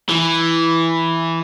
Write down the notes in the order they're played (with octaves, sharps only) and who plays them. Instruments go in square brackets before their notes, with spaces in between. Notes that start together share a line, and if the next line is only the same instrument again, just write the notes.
[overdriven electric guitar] E3